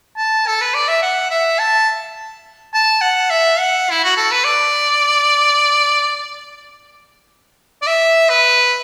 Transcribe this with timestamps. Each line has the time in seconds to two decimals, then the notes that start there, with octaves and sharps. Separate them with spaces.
0.16 A5
0.47 A4
0.61 B4
0.74 D5
0.88 E5
1.02 F#5
1.30 E5
1.59 A5
2.74 A5
3.01 F#5
3.30 E5
3.59 F#5
3.90 E4
4.04 F#4
4.17 A4
4.31 B4
4.44 D5
7.82 D5
7.87 E5
8.29 B4